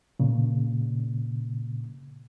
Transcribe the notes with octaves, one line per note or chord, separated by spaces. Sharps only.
A#2 C#3